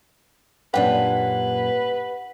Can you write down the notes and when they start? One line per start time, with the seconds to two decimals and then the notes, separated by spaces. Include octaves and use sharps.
0.74 F#2 A#2 C#4 D4 G4 B4 F#5